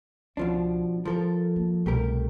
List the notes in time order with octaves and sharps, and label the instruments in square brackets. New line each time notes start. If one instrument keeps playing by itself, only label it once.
[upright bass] C#2 [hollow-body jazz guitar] B2 F3 D4
[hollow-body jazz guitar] F3 A4 A#4 [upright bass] C#4
[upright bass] A#3
[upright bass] C2 B2 [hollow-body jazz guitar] A3 G4 A#4